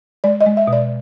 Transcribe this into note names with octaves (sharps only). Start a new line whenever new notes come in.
G#3 D5
D#5
G#3
E5
B2
D5